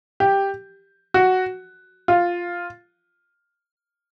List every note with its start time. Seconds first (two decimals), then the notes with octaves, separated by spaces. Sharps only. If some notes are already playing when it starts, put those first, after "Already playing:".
0.20 G4
1.14 F#4
2.08 F4